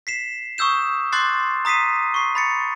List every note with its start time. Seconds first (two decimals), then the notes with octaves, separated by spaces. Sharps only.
0.07 B6 C7 E7
0.58 C#6 D#6 E6 G6 E7
1.12 C6 D6 F#6 G6 A6 C7
1.65 A#5 D#6 B6 C7 D#7
2.14 C#6 C7
2.35 B5 A6 C#7